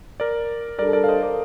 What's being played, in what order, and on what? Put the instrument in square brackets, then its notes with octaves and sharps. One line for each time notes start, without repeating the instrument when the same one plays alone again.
[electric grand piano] A#4 D5
[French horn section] G3 D4 A4 [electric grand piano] A#4 D5
[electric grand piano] A#4 D5
F5
C5 D#5
A#4 D5